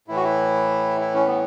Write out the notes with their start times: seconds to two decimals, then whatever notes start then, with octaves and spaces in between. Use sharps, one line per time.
0.08 A2 E3 E4
0.16 F#4
0.24 E4
1.01 E4
1.14 C#4
1.27 B3